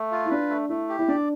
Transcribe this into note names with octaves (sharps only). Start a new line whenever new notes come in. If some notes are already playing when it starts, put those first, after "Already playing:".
Already playing: A3
F4
E4
D4 B4
A3
A3 E4
G4
E4
D4 D5